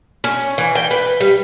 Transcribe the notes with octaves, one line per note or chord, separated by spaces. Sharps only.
C#4
E3
G5
B4
G3